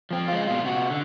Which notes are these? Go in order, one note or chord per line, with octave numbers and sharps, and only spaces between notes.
F3 C4
G#3 F4
B2 F4
C3 F#4
D3